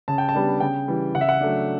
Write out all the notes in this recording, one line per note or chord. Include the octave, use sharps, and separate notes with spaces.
C#3 A5
G5
A5
G3 B3 D4
C#3 G5
E3 G3
C#3 F#5
E5
F#5
F#3 A3 D4